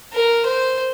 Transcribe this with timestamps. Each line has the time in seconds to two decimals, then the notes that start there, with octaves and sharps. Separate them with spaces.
0.14 A#4
0.46 C5